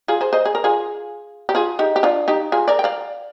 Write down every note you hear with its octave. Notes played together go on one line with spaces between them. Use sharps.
F4 G#4
G#4 C5
C5 D#5
G#4
A#4
F4 G#4
G4
F4 G#4
D#4 G4
G4
D4 F4
D#4 G4
F4 G#4
A#4 D5
G5
D5 F5